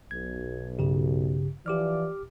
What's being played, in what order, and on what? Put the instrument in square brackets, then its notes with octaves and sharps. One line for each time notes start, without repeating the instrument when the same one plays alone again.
[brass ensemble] B1 [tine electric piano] G#6
[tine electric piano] G2 C#3 G4
[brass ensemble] E3 F3 D5 [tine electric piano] G4 D6 F6